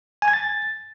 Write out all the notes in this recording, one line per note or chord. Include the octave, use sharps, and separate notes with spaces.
G#5
G#6
A6